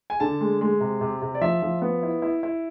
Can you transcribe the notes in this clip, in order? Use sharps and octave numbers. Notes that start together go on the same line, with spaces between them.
G#5
D3 A5
G#3
G#3
C3
C3
C3
D5
F3 E5
F3
B3
E4
E4
E4